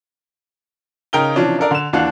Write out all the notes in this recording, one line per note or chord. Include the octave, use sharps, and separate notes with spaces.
C#3 D#4 A#4 G5 F6 G7
C3 E3 F3 C#4 D4
D4 A4 A#4 D5
D3 E7
D#2 E3 D4 F5 F#5 F#6